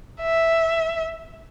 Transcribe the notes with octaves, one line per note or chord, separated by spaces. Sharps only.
E5